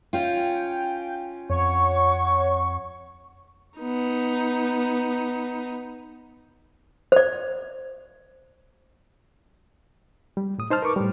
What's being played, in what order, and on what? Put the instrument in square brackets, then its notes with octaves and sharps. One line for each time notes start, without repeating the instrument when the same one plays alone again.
[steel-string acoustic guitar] C#4 F4 [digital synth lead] G5
[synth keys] F2 [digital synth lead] C#5 [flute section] F#5 C#6
[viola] B3 D#4
[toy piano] C5 D5
[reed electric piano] G3
A2 D#6
D#4 C5 A5 F6
A#4 B4 C#6 D6
A2 G3